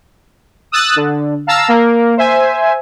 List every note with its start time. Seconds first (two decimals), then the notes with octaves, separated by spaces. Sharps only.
0.72 D#6 E6 F#6 A6
0.96 D3
1.47 F5 A5 A#5 E6
1.68 A#3 A#4
2.17 C5 E5 G#5